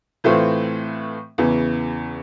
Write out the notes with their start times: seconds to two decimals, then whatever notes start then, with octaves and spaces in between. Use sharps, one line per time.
0.24 A2 E3 A3 C4 F4
1.38 E2 C#3 E3